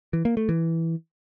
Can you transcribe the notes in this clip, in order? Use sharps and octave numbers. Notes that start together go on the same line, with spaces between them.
E3
A#3
A3
E3